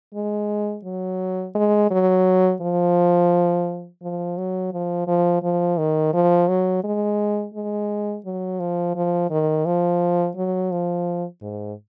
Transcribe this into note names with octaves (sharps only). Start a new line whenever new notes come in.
G#3
F#3
G#3
F#3
F3
F3
F#3
F3
F3
F3
D#3
F3
F#3
G#3
G#3
F#3
F3
F3
D#3
F3
F#3
F3
G#2